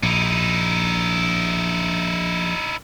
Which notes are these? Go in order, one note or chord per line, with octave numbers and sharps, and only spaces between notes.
A#1 D#4 E4